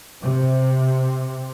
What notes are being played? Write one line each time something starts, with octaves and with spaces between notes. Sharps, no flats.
C3